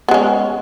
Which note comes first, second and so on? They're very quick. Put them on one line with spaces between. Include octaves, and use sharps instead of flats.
B3 G#3 C#4